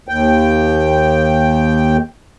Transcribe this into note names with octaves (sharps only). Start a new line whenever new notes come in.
D#2 G5